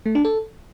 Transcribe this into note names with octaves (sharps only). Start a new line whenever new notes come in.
A3
D4
A4